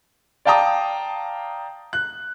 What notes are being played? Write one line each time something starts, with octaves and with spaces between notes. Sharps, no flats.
D5 F5 G5 A5 A#5 D#6
F#6